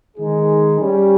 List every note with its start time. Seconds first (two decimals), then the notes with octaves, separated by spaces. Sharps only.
0.17 D#3 G#3 D#4 G#4
0.80 G3 C#4 G4